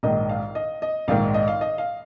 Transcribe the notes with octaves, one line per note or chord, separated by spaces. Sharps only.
A#1 G#2 D#3 D#5
F5
D#5
D#5
A#1 G#2 D#3 F5
D#5
F5
D#5
F5